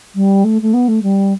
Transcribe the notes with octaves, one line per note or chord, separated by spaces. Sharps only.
G3
A3
A3
B3
A3
G3